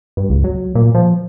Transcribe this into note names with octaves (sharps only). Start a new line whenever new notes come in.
G2
C#2
F#3
A#2
F3